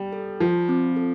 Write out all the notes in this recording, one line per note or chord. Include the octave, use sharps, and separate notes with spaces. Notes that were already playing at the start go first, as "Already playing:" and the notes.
Already playing: G3
A4
F3 F4
C4
A4